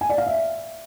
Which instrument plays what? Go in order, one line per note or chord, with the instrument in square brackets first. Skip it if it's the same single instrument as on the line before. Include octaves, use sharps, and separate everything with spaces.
[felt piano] G#5
D5
F5
E5